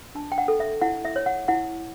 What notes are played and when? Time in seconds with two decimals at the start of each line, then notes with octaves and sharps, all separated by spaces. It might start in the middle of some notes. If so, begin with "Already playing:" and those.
0.15 D4 A5
0.32 G5
0.38 F#5
0.48 A4
0.60 E5
0.81 E4 F#5
1.05 E5
1.16 C#5
1.26 F#5
1.48 E4 F#5